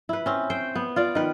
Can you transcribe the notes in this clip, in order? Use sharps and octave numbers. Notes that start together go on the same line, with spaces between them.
E4 B4
C4 C#4
C5 G5
B3
F4 D5
D#3 B4